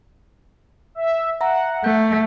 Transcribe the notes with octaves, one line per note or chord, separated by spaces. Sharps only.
E5
E5 F#5 A#5
A3 G6